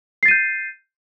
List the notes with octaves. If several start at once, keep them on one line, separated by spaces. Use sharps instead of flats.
G6 A6 C7 D#7